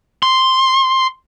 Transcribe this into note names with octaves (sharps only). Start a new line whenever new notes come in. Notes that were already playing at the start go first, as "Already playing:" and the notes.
C6